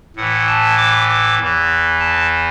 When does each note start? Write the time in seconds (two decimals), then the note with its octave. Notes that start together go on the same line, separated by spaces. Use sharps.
0.16 A2 E3 F#5
0.47 A5
0.77 D6
1.08 D6
1.39 E2 E3
1.99 A5